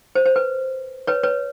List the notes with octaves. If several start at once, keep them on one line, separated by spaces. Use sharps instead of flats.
C5
C5
B4
B4 C#5
B4 C#5